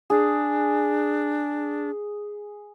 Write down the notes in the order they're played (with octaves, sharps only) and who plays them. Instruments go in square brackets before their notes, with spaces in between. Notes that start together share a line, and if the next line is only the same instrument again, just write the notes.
[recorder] D4 [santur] G#4